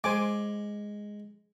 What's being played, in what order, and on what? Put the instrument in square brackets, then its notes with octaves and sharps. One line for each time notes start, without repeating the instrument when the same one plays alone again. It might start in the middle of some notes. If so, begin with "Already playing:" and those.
[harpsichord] G#3 [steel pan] C5 G#5 D6